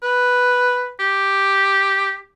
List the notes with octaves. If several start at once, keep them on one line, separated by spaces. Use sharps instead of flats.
B4
G4